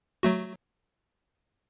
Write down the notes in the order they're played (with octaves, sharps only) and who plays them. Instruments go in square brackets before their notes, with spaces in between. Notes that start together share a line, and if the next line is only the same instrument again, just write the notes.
[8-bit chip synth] F#3 A3 F#4